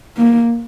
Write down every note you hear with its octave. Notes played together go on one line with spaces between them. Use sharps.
A#3